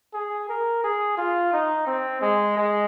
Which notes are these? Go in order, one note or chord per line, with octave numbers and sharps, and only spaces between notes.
G#4
A#4
G#4
F4
D#4
C4
G#3
G#3